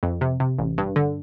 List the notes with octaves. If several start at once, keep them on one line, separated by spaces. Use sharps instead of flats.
F2
C3
C3
A1
G2
D3